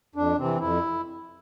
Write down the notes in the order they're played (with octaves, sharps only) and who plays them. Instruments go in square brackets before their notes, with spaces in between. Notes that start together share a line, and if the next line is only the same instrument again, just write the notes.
[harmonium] F2 D4
C3 E3 C4
F2 E4